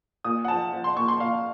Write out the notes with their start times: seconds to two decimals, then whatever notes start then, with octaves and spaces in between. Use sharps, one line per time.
0.24 A#2 D#6
0.45 F#5
0.48 F3 A5
0.73 F3
0.84 C6
0.97 A#2 C#6
1.08 C6
1.20 A#2 F5